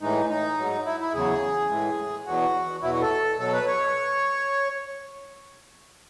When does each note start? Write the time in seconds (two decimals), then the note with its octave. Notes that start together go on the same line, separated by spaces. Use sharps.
0.02 A2 E3 G#3 D#4
0.30 D#4
0.58 G#2 F#3
0.86 E4
1.00 E4
1.14 E2 C#3 F#3 G#4
1.70 A2 E3 G#3
2.26 E2 B2 F#3 F#4
2.82 E2 B2 F#3 E4
2.92 F#4
3.01 A4
3.39 B2 F#3 A4
3.53 B4
3.67 C#5